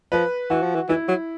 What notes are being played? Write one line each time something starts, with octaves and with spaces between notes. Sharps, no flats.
F3 B4
E3 F#4
F3
E3
E3 E4
F#3